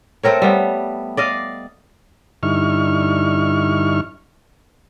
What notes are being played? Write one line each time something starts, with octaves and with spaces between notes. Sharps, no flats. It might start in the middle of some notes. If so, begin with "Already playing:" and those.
A3 C4 A#4 C#5
G3 B3
D5 D#5 F5
G2 D3 D#4 E4 C#6 F6